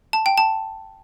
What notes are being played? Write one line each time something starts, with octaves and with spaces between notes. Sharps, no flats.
A5
G5
A5